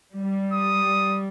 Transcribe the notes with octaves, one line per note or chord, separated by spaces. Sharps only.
G3
D#6